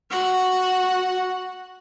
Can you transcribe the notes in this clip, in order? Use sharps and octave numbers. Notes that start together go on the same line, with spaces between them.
F#4 F#5